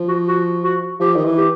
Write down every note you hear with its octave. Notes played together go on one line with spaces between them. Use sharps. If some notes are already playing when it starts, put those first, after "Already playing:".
Already playing: F3
F#4
F#4
F#4
F3 G4
D#3
E3
G4